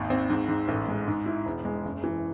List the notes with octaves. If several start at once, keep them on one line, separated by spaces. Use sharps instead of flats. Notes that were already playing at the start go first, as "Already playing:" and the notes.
Already playing: G#1 D#2
C4
G#2
G#2
A1
G#3
G#2
E4
E1
G#3
F#1
E3